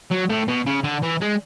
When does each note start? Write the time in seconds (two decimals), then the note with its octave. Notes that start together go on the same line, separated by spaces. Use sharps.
0.11 F#3
0.30 A2
0.48 B2
0.66 C#3
0.84 D3
1.03 E3
1.21 G#3